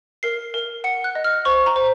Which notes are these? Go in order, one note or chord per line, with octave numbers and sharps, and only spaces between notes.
A#4 C7
A#4
F#5 C#7
F#6
D#5
F6
C5 C#6
A#5
C5